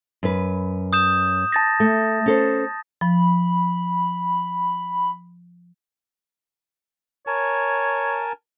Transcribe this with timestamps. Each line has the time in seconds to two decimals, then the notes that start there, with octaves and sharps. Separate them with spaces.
0.23 F#2 B4
0.93 D#6 G6 E7
1.52 A5 A6 A#6
1.80 A3
2.26 C#4 A4 C5
3.01 F3 B5
7.27 A#4 C#5 G#5 A5